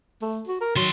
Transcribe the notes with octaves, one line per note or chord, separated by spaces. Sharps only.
A3
F#4
A#4
D#3 F#3 C6